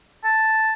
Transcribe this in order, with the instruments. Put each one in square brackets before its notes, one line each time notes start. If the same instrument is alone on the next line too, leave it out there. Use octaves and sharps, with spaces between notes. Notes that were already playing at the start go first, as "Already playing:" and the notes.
[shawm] A5